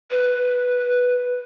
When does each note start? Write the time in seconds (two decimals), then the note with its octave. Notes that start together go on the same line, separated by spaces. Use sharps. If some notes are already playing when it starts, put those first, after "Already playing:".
0.11 B4